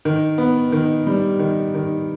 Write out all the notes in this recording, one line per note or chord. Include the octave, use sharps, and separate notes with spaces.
D#3
B3
D#3
G3
D#3
D#3